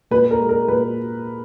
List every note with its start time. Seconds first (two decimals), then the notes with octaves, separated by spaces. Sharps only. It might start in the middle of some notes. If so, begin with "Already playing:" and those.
0.11 A#2 B4
0.31 A#4
0.40 G#3
0.49 A#4
0.68 A#2 B4